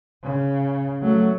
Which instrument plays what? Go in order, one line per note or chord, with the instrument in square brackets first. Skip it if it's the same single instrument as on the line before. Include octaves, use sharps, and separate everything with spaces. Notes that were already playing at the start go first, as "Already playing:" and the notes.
[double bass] C#3
[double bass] F#3 [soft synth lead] A3